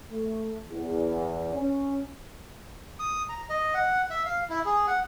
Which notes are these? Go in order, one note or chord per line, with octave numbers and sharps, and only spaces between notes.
A3
E2
C#4
D#6
A#5
D#5
F#5
E5
F5
E4
G#4
F#5